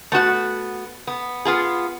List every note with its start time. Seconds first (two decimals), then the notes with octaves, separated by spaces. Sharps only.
0.12 A3 B3 F#4 F#5
1.07 B3
1.45 B3 F4 G#4